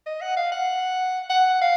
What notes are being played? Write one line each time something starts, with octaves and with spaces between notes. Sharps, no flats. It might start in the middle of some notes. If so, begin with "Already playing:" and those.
D#5
F#5
F5
F#5
F#5
F5